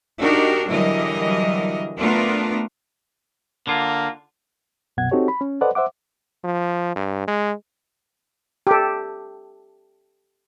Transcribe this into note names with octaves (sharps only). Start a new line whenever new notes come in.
D4 D#4 F#4 G4 A#4
D3 E3 F#3 G3 A#4 D#5
A3 B3 D4 F4 A#4
D3 A#3 F4
C2 F#2 B2 F#5 G#6
C4 D#4 F#4 G4 A4 C#5
B5
C#4
A4 B4 C5 D5 D#5 F#5
C5 E5 F#5 D6
F3
G2
G#3
G4 A4